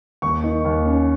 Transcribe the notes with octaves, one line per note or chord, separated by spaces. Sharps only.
D#2 C#6
D#3
D#2
C#4